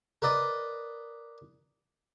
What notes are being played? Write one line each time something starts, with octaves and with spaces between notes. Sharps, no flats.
A#4 B4 D5 D#5